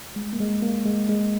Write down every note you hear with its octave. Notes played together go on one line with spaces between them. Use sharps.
G#3
A#3
G#3
A#3
G#3
G#3